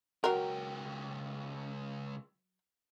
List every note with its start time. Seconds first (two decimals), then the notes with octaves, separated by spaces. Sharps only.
0.24 C#2 F#3 A#4 G5